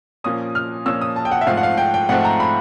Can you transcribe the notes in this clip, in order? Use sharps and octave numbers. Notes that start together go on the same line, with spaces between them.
A#2 F3 A#3 C#4 D#6
F6
A#2 F3 A#3 C#4 E6
D#6
A5
G5
F#5
E5
G#2 F3 A3 C4 F5
F#5
F5
G5
G5
G#2 F3 A3 C4 F#5
A#5
B5